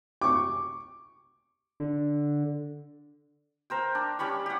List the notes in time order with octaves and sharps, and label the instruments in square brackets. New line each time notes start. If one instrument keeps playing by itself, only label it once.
[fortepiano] C#6 D6
[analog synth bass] D3
[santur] A#4 C5 G5
D4
G3 C#4 B5 C#6
G4 F#5